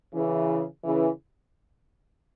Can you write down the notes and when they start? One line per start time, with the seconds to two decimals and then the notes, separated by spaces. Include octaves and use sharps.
0.14 C#3 E3
0.84 C#3 E3